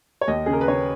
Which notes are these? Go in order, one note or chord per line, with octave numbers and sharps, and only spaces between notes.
C#5
D#2 D#5
C#3 G#4
A#4
B4
C#3 C#5